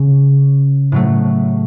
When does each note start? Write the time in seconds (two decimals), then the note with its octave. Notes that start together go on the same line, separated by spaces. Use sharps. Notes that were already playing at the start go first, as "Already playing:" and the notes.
Already playing: C#3 C#4
0.92 A2 F#3 A3